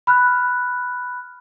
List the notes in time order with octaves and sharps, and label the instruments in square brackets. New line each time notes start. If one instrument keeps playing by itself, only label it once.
[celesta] B5 F6 F#6